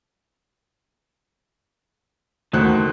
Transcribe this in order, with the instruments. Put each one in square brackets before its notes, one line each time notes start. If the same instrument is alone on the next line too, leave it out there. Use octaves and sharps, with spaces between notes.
[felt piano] D#2 C5 F#6 [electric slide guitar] A3 D#4 F#4